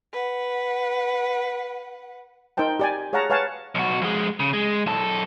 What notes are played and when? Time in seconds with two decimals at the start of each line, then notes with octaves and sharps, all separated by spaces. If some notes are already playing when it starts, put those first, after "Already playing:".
0.13 B4 F#5
2.57 D#4 A#4 C5 G5 A5
2.79 G4 D5 G#5
3.13 G#4 C#5 F5 F#5 A5 A#5
3.30 B4 C#5 F5 F#5 G#5 A5
3.75 B1 F#4
4.02 F2 G#3
4.40 C#3
4.53 G#3
4.87 F#2 A4